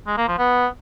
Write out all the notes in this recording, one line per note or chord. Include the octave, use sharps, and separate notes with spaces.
G#3
A#3
F3
B3